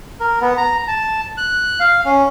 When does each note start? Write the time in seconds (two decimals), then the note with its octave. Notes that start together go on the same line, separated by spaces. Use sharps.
0.20 A#4
0.41 B3
0.57 A#5
0.88 A5
1.37 F#6
1.80 F5
2.05 C#4